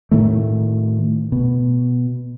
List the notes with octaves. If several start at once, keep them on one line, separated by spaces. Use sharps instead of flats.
A2 D#3 A3
B2